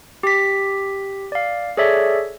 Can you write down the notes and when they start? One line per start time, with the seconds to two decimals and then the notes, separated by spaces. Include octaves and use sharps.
0.23 G4 B6
1.32 D5 F5
1.77 G#4 A4 C#5 D5 E5